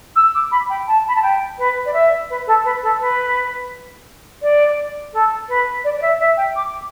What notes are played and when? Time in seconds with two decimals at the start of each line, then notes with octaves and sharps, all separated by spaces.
0.15 E6
0.34 D6
0.51 B5
0.69 G5
0.87 A5
1.07 B5
1.15 A5
1.22 G5
1.58 B4
1.85 D5
1.93 E5
2.29 B4
2.46 A4
2.64 B4
2.82 A4
2.99 B4
4.42 D5
5.13 A4
5.48 B4
5.84 D5
5.97 D5
6.01 E5
6.19 E5
6.36 G5
6.55 D6